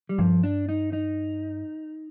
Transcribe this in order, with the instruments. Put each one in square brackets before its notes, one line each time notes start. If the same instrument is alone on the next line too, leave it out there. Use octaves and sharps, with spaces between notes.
[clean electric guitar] G3
[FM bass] G2 [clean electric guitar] F3
[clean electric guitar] D4
D#4
D#4